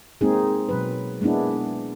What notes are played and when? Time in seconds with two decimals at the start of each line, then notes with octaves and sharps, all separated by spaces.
0.21 G#3 A#3 C4 D#4 G#4
0.69 B2 F#3 B4
1.21 G#3 A#3 B3 D4 E4